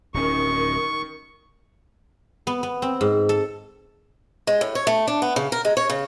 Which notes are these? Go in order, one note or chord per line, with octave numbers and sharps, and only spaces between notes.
D1 D#3 C#4 C#6
B3
B3
C4
G#2
A4
G#3
A2
C#5
A3
D4
B3
C#3
A#4
G#3
C#5
C#3